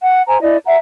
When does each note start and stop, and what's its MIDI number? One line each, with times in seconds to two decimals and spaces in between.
0.02 0.22 78
0.28 0.41 72
0.28 0.41 80
0.28 0.41 82
0.42 0.58 64
0.42 0.58 74
0.42 0.58 75
0.66 0.76 76
0.66 0.76 78
0.66 0.76 82